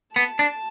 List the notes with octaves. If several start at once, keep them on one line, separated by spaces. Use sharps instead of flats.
B3 A5
D4